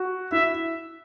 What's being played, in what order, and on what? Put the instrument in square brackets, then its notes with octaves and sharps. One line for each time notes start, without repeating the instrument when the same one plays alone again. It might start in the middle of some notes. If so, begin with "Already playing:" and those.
Already playing: [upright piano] F#4
[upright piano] E4 [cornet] E5